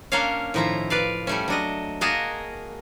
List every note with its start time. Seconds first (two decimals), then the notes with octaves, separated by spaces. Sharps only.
0.12 A#3 C#4 D4 C#5 F5
0.54 A2 D#3 F3 E4 A#5
0.90 B4 D5 F5
1.27 G3 A3 C#4
1.48 F#3 D4 D#5
2.01 A#3 F#4 G#4 A#4 D#5 A5